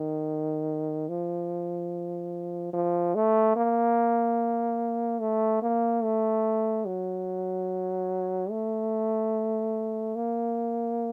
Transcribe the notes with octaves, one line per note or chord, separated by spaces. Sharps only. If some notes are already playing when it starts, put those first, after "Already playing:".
Already playing: D#3
F3
F3
A3
A#3
A3
A#3
A3
F#3
A3
A#3